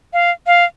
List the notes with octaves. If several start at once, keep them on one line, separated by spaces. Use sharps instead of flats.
F5
F5